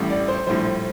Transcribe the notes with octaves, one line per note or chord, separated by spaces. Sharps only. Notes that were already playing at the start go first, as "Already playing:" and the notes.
Already playing: A1 A2 G3
D5
C5
A#1 A2 G3 C5